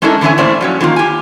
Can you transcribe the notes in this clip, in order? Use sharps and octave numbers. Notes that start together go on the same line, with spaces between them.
G#3 C#4 D4 E4 A4 A#4
D3 E3 C4 C#4 E5 G#5
A2 A3 A#3 C5 D5 E5
F3 F#3 C#4
D3 D#3 A#3 F4
G4 G#5